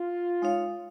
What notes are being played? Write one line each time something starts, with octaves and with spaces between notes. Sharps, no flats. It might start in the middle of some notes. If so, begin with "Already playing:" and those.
Already playing: F4
G#3 D#4 C#5 F5